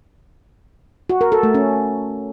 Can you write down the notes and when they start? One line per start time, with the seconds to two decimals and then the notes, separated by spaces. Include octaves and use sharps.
1.10 F#4
1.21 A#4
1.32 A4
1.43 A3
1.54 C#4